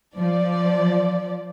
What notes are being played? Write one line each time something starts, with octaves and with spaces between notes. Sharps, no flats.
F3 D5